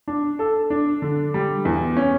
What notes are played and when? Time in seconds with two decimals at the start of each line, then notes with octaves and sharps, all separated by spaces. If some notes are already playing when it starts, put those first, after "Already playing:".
0.08 D4
0.39 A4
0.70 D4
1.02 D3
1.34 G3
1.65 E2
1.97 C#4